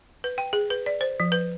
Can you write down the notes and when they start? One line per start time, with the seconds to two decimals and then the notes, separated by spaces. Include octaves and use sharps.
0.24 B4
0.38 G5
0.53 G#4
0.70 B4
0.86 D5
1.01 C5
1.20 F3
1.32 B4